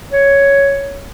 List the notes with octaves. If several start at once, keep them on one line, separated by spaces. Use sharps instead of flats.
C#5